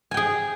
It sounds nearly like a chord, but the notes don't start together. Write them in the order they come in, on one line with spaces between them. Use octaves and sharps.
G#5 G5 G#4